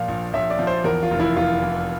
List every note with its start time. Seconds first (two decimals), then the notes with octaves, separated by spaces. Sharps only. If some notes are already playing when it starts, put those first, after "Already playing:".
Already playing: A#2 F3 F5
0.08 A#1
0.33 A#1 E5
0.50 D5
0.59 F3
0.67 C5
0.84 E2 A#4
1.03 F4
1.11 F1
1.20 E4
1.36 F1 F4
1.62 E3